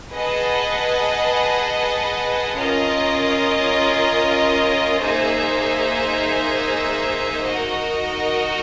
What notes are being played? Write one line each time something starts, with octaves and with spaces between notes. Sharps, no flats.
G#4 B4 D#5 F#5 A5
C#4 F4 A#4 D#5
A#3 D#4 G#4 C5 E5
D#4 F#4 A#4 D#5